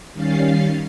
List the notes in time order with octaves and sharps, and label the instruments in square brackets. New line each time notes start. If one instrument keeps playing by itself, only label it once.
[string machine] D#3 G3 C#4 F5 A6 C7